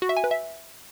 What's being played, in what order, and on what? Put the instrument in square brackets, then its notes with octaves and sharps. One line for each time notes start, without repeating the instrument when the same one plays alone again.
[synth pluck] F#4
E5
G#5
B4
E5